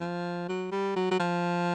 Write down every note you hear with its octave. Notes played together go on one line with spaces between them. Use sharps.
F3
F#3
G3
F#3
F#3
F3